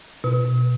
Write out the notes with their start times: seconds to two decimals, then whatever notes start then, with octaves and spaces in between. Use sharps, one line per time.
0.24 B2